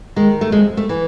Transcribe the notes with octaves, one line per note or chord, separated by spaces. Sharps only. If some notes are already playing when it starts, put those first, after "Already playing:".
D#3 G#3
A3
F2 G#3
A3
E3